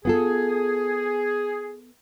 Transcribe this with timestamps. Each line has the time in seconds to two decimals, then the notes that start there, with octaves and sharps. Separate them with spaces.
0.05 B3 F4 G#4 A4